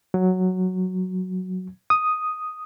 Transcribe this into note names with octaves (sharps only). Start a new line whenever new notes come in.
F#3
D#6